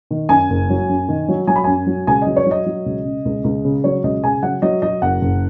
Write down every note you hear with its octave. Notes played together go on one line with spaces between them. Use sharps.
D#3
F#2 G#5
F#1
F#3
F#2
D#3
F#3
F#3 G#5
B5
F#2 G#5
F#3
C#2 G#5
F#3 D#5
C#5
F#3 D#5
F#3
C#2
C#3
C#2
C#2
C#3
F#3 C#5
C#2 D#5
C#3 G#5
F#3 F#5
F#3 D#5
F#3 D#5
F#1 F#5
F#1